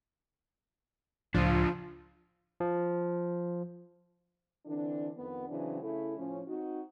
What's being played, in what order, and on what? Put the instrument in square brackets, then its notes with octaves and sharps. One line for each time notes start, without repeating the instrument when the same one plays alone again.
[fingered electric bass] C#2 A2 [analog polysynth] F3 [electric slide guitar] D4 F4
[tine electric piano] F3
[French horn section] D3 E3 C4 D4
F2 D#3 B3
C#3 E3 F#3 C4 D4
C#3 A3 E4
A2 F3 C#4
C4 D#4 F#4